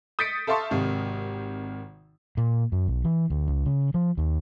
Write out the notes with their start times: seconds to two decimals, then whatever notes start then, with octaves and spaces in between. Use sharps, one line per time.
0.19 D#6 G6 A6 B6 C#7 D7
0.47 A4 E5 F5 A5 C6 C#6
0.71 G#1 C3 D#3
2.37 A#2
2.72 F#2
2.88 B1
3.04 E3
3.30 D2
3.48 C#2
3.66 C#3
3.94 F3
4.17 D#2